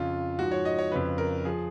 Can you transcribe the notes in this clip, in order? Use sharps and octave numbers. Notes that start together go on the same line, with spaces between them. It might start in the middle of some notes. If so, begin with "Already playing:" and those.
Already playing: F2 C#3 F3 F4
G#2 F3 F#4
C#5
D#5
C#5
F2 C#3 F3 B4
A#4
F3 G#4